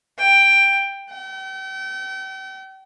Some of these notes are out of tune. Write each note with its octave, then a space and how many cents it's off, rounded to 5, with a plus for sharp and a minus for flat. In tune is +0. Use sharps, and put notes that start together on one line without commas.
G5 +10
G5 -40